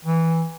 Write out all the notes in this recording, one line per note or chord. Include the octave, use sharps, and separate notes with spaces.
E3